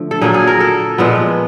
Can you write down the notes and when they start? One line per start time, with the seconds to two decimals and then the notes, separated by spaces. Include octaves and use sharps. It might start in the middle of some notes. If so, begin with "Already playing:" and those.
Already playing: D3 F3 A3
0.11 A4
0.22 A#2 F#3 A#3 G#4
0.34 G#4
0.47 A#4
0.60 A4
0.98 A#2 F3 G#3 B3